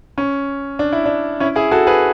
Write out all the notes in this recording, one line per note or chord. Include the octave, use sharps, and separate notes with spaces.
C#4
D4
E4
D4
C#4 E4
E4 G#4
F#4 A4
G#4 B4